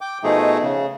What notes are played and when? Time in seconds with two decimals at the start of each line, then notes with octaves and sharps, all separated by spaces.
0.01 G5 D6
0.24 B2 F3 A3 D#4 G#4
0.62 C#3